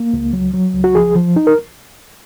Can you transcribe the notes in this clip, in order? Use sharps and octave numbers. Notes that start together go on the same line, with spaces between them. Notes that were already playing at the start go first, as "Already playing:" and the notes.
Already playing: A#3
C#2
F#3
F#3
C#2
F#4
F3 G#4
F3
D#4
A#4